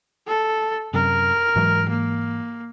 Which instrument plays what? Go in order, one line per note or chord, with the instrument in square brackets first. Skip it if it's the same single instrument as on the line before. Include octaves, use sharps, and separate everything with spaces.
[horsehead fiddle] A4
[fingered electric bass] F#2 C3 [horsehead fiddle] A#4
[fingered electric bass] G#2 E3 F#3
[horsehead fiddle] A#3